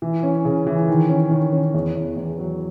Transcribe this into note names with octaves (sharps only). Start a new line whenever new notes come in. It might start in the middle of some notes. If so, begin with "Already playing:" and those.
E3
C#4
C#3
E3
D#3
C#4
D#3
C#4
E2
E2
E2
F#3